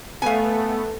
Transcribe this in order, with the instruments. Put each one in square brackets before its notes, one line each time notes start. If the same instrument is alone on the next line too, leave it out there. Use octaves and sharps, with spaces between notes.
[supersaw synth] A3 B3 [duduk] A4 [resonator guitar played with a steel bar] F5 G#5